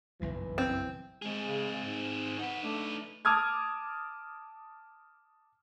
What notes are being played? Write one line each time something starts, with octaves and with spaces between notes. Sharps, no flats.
F#1 B1 G2 E3
C4
G#3 C4 G#4
C#3
G#2
D#4 B4 F#5
A3 D4
A5 D6 D#6 F6 G#6